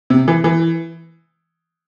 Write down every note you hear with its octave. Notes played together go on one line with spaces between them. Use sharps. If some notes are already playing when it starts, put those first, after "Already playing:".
C3
E3
E3